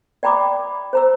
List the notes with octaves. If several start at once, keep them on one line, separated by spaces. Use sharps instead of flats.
D5 G5 A#5 B5 D6 D#6
C5 A#5 E6